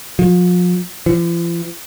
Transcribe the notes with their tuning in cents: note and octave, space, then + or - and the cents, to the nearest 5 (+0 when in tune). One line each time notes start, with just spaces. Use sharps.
F3 +35
F3 -45